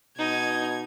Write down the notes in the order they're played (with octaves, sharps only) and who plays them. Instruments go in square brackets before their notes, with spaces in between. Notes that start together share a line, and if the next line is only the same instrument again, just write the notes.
[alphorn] B2 [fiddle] D#4 [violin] G#6